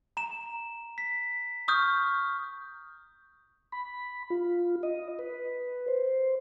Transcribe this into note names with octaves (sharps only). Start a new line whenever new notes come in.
A#5 E7
B6
C#6 D#6 F6 G6
B5
F4
D#5
B4
C5